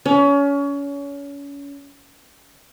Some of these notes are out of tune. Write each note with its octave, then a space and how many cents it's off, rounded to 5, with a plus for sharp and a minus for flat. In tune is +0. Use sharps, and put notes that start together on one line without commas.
C#4 +30